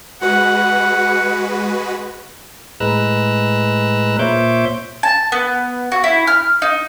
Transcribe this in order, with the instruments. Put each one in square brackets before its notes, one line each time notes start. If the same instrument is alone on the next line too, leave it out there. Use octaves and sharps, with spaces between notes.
[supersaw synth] G#3 F#4 B4 [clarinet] F#5
[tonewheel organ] A2 G#3 B4 A#5 E6 F#6
A#2 C5 C#5 E5 D6 G6
[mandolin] A5
B3
F#4
E4
F6
D#4